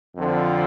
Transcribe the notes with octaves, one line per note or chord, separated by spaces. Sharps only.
F2 D3 F3 C4